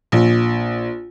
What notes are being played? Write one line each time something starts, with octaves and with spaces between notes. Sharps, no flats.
A#1